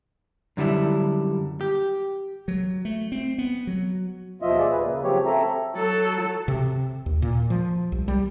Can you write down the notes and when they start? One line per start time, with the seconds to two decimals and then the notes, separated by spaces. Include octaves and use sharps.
0.57 F#2 D3 G3 E4
1.61 G4
2.48 F#3
2.85 A3
3.12 C4
3.38 B3
3.67 F#3
4.42 D#2 B2 F3 F4 D#5 E5
4.59 G#4 D5 E5
4.71 D#2 A#2 B4
4.84 C#3 A#3
5.04 C#3 F3 F#3 C4 G4 C#5
5.26 C4 A4 E5 A#5
5.76 F#3 A4
6.48 C3
7.06 D#2
7.22 A#2
7.50 F3
7.92 C2
8.08 G3